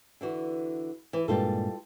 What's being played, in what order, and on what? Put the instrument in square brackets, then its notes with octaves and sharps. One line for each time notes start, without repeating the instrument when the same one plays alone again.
[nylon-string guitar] D3 E3 F#4
E3
[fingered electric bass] G2 A#2 G#3 [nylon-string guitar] G3 F4 A4